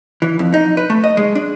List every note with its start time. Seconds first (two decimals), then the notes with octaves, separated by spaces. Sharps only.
0.22 E3
0.39 F2
0.54 D#4
0.77 B4
0.90 A3
1.04 D#5
1.17 G#3
1.35 D4